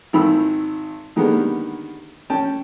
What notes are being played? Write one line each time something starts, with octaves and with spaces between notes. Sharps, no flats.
G#1 D#3 B5 E6
D3 D#3 G3 G#3 A#3 B3
C#4 G5 A5